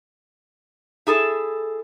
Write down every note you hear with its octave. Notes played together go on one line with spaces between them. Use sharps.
E4 G#4 A4